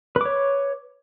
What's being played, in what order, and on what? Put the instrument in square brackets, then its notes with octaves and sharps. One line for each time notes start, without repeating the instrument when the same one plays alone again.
[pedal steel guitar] B4
D6
C#5